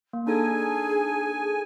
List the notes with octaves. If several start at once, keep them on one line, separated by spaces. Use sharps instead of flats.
A#3
D4 D#4 G#4 A4 G#5